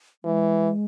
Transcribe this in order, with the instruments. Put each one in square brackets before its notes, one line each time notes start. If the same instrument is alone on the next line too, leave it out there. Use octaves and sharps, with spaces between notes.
[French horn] E3 [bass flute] G#3